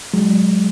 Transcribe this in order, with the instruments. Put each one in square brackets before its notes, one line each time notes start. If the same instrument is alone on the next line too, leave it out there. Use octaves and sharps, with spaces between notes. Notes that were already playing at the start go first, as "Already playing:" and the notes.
[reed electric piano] F#3 G#3